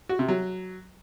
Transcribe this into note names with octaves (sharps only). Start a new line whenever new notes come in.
F#4
C3
F#3